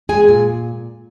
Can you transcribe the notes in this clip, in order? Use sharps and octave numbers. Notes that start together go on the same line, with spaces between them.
G#3 G#4 G#5
A#2